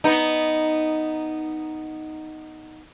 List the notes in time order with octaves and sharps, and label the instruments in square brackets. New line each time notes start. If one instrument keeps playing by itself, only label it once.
[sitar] B3 D#4